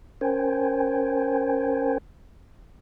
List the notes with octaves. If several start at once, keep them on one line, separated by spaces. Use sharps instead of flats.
C#4 A#4 C5 G5 G#5